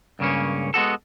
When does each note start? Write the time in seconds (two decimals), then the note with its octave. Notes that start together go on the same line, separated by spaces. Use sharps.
0.19 C#2 G2 C#3 A#3 C#4
0.74 G#3 B3 F#4 A4